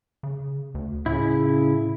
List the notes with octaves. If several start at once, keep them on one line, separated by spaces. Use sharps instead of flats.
C#3
D2
A2 C#3 E4